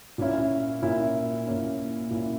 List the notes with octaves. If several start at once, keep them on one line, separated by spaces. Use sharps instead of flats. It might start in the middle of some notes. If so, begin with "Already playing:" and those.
A#2 A#3 C#4 E4
A#2 A#3 C#4 E4
A#2 A#3 C#4 E4
A#2 A#3 C#4 E4